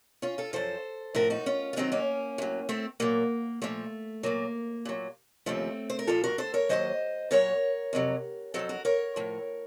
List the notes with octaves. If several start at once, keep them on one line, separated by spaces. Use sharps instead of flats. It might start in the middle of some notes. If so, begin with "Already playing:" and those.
C#4 F4
F4 A4
F#2 F3 A4 C5
A2 F3 F#4 A#4
D#4 F#4
C#4 F4
F4
F#2 D#3 F#3 C4 D#4
A#3 C#4
A2 F#3
A3 C4
A#2 F#3 A#3
A#2 F3 A3
A#2 F#3 A#3
A#2 F#3
D#2 C#3 F3 A3 C4
C5
A#4
A#2 F3 F4 A4
F#4 A#4
A4 C5
A#4 C#5
D#2 C#3 F#3 C5 D#5
A#2 F#3 A#4 C#5
F2 C3 F#3
F2 D#3 F#3 A4 C5
F#4 A#4
A#4 C#5
A2 F3